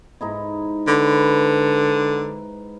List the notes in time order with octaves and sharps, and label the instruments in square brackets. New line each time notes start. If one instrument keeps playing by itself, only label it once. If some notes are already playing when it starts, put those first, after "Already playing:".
[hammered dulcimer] G#2 D#4 E4
[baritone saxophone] D3 [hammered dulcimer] B4